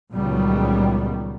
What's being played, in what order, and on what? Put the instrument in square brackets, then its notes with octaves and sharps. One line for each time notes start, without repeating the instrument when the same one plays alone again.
[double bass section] C#2 A#2 D#3 F#3 G3 B3